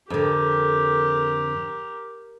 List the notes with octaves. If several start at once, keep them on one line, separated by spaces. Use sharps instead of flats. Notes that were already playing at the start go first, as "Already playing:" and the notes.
F2 D3 G4 A#4